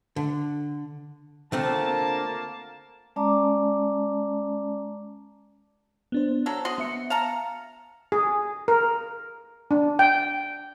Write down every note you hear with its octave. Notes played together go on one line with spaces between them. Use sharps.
D3
D3 A3 A#3 C4 F4 A5
G#3 C#4 D5 A5 A#5 D6
B3 D4 C5
F#3 A4
F#4 D#5 C6
B3 E5 C#7
F5 A5 A#5
G#4
A#4
D4
G5